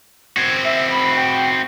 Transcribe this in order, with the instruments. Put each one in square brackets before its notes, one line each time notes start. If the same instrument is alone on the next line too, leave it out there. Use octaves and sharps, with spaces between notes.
[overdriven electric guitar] C4 F#4 [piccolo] G#6
[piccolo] E5
B5
G5